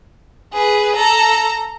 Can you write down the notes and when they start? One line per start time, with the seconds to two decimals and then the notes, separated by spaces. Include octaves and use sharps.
0.53 G#4 B4
0.96 A4 A#5